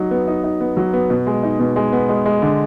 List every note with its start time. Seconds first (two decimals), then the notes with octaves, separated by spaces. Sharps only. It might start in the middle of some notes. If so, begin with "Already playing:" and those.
Already playing: F#3 D#4
0.11 B3
0.28 D#4
0.44 D#4
0.61 B3
0.77 F#3
0.93 B3
1.10 B2
1.27 G#3
1.43 D#4
1.59 B2
1.76 G#3
1.93 B3
2.09 G#3
2.26 G#3
2.42 D3